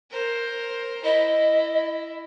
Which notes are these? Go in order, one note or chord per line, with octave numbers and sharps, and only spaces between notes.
A#4 C5
E4 D#5